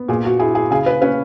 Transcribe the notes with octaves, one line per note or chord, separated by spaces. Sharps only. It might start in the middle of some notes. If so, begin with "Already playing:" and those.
Already playing: B3
A#2 G#4
F#4
E4 G#4
G#4
C#3 G#4
B4
C#4 B4